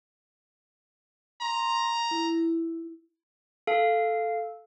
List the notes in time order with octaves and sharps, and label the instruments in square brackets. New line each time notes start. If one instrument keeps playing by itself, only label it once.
[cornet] A#5 [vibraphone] C6
[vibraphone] E4
[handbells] A4 F5